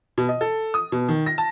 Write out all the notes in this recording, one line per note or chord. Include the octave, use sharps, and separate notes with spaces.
B2
D#5
A4
D#6
B2
D#3
A#6
A5